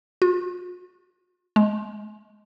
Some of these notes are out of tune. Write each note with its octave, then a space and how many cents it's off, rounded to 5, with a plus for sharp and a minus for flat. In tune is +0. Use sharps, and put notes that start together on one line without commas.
F4 +40
G#3 +10